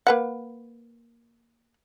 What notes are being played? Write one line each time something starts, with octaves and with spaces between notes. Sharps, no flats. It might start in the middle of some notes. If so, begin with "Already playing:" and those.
A#3 B4 F#5